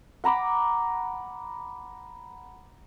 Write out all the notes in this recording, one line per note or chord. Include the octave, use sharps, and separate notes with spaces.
F#5 A#5 B5 D6